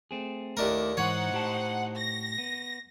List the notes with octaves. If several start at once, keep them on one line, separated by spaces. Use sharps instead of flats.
A3 C4 G#4
D#2 A3 D4 E4 A#4
G#2 E3 D#4 C5 C#5 F#5
A2 G4 A5
A#6
B3